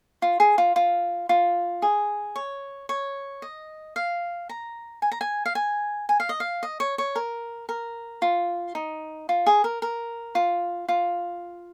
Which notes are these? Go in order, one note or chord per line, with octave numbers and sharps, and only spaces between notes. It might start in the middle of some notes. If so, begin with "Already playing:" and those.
F4
G#4
F4
F4
F4
G#4
C#5
C#5
D#5
F5
A#5
G#5
A#5
G#5
F5
G#5
G#5
F5
D#5
F5
D#5
C#5
C#5
A#4
A#4
F4
D#4
F4
G#4
A#4
A#4
F4
F4